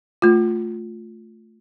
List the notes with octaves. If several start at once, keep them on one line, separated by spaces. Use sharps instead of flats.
A3 F4